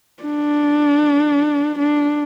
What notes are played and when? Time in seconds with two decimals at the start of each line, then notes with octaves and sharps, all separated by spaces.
0.23 D4
1.79 D4